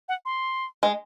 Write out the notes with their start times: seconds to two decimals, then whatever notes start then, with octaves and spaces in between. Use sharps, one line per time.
0.09 F#5
0.25 C6
0.83 G#3